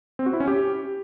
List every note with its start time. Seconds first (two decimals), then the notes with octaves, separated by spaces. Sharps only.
0.19 C4
0.26 F#4
0.33 E4
0.40 C#4
0.47 G4